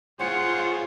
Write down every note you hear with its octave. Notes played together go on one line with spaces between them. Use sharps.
F4 G#4 C5 C#5 F#5